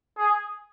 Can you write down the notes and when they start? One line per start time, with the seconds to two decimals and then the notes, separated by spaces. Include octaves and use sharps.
0.17 G#4